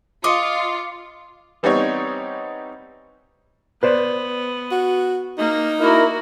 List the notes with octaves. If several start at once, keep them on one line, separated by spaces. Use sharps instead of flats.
F4 D#5 D6 C#7
E3 G3 B3 C4 D#4 C#5
B3 B4 C5 D5
F#4
A#3 D#4
A#3 E4 F#4 A#4